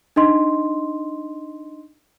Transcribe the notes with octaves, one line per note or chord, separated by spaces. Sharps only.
D4 D#4 D#5 C6